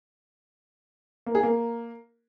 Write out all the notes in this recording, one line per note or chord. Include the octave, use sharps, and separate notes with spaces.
A#3
G#4
A#3